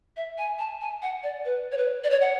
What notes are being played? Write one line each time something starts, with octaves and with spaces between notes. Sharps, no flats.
E5
G#5
A5
G#5
F#5
D5
B4
C#5
B4
D5
C#5
F#5